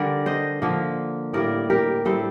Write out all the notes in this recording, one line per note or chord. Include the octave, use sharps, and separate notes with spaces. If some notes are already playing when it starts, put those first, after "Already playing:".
Already playing: D3 G3 D4 A#4 D5
C5 D#5
D3 F3 A#3
A2 G3 A#3 A#4 D5
G4 A#4
A2 G3 C4 A4 C5